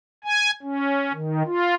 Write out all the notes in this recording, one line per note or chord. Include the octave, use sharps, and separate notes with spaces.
G#5
C#4
D#3
F4